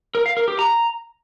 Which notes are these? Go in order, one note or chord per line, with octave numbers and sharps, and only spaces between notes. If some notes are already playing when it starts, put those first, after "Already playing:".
A#4
F5
A#4
G4
A#5